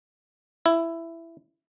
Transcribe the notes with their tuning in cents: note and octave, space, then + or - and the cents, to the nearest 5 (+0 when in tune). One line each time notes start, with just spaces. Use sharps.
E4 +10